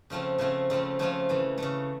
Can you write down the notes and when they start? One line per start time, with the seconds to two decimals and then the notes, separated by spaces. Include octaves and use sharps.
0.10 C#3 F3 A3 C4 F4
0.38 C#3 F3 A3 C4 F4
0.70 C#3 F3 A3 C4 F4
0.99 C#3 F3 A3 C4 F4
1.29 C#3 E3 A3
1.58 C#3 E3 A3